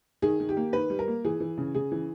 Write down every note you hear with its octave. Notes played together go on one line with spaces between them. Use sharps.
D#3 G#4
D#3
G4
A#3
D#3 B4
G3
A#4
A#3
E3 G#4
E3
C#3
C#3 G#4
E3